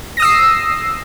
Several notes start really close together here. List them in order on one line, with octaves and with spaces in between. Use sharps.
A#6 D#6 E6 C7